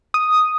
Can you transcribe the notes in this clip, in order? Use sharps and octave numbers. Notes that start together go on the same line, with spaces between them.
D#6